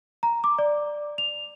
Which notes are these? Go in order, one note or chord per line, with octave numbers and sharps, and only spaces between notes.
A#5
D6
D5
F7